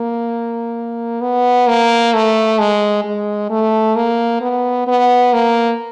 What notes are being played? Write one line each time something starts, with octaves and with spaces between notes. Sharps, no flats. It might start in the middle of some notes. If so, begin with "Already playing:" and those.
Already playing: A#3
B3
A#3
A3
G#3
G#3
A3
A#3
B3
B3
A#3